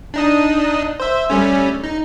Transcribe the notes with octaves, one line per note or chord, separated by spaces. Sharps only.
D4 D#4 D#6
C5 E5
G3 A3 C#4
D#4